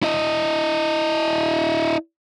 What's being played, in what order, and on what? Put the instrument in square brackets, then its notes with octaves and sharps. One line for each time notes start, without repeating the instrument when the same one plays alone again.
[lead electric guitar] E4 D#5